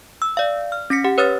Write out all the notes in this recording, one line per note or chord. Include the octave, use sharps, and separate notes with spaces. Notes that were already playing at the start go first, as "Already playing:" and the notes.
E6
D5 F5
F6
C#4 A#6 B6 C#7
G4 F#5
B4 C#5 D#6 F6 A6